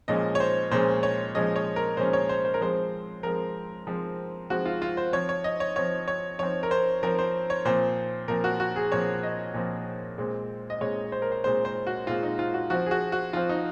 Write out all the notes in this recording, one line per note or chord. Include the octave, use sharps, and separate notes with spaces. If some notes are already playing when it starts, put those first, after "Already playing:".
A#2 F3 G#3 C#4 D#5
C#5
C5
A#2 F3 G#3 C#4 C5
C#5
A#2 F3 G#3 C#4 D#5
C#5
A#4
A#2 F3 G#3 C#4 C5
C#5
C5
C5
A#4
F3 G#3 C4 C5
F3 G#3 C4 A#4
F3 G#3 C4
F3 G#3 C4 F#4
F4
F4
C5
F3 C4 C#5
C#5
D#5
C#5
F3 C4 C#5
C#5
F3 C4 C#5
A#4
C5
F3 C4 A#4
C5
C#5
A#2 F3 C4 C5
A#2 F3 C4 A#4
F#4
F#4
G#4
A#2 F3 C4 C#5
D#5
A#2 F3 C4
A#2 G#3 C4
D#5
A#2 G#3 C4 C#5
C5
A#4
C5
A#2 G#3 C4 C5
C5
F#4
A#2 G#3 C4 F4
D#4
F4
F#4
F3 C4 F#4
G#4
F#4
F#4
F3 C4 F4
D#4